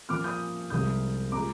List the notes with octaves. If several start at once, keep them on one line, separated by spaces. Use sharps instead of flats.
A#2 F3 A#3 D6 F6
D#6 G6
C2 C3 F3 G#3 D#6 G6
A#2 G#3 A#5 D6